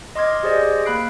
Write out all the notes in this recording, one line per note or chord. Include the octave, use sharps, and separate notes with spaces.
D#5 C6 D6 F6 G#6
G4 G#4 C5 D5 D#5
A#3 F5 B5 F#6 C7 D7